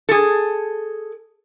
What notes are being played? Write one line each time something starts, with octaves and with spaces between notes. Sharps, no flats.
G#4 A4